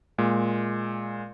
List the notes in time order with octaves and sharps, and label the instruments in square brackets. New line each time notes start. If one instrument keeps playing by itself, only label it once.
[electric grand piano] A#2 G#3